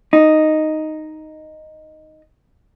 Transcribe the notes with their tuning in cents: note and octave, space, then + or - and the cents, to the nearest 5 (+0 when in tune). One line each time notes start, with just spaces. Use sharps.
D#4 +0